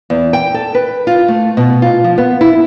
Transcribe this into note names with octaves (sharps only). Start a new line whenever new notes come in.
E2
G5
A4
B4
F4
A3
B2
F4
F3
B3
E4